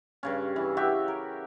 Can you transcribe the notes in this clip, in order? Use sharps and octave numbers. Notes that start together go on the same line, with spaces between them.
G2 C#3 C#4
E3
F#4 G4 E5
A#4